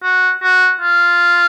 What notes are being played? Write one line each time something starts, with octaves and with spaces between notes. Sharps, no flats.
F#4
F#4
F4